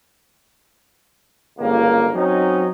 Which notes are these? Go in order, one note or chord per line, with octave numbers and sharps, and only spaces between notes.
G1 C#2 A#3
F#3 C4 C#4 D#4